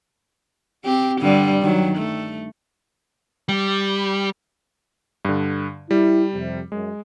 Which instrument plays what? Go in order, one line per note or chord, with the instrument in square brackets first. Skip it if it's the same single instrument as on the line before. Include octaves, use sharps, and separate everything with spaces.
[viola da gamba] C4 G4
G2 D3 G3
D#3 F#3
A3
[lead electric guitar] G3
[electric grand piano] G2 D3
[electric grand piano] G3 [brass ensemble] E4
[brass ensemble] F2 C3
[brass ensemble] F#2 [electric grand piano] G#3